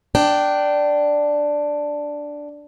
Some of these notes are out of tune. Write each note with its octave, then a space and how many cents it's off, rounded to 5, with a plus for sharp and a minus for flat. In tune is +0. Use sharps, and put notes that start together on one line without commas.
D4 +0 G5 -15